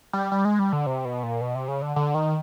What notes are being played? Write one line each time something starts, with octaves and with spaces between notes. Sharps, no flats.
G3
G3
G#3
G3
D3
C3
B2
A#2
B2
C3
C#3
D3
D3
D#3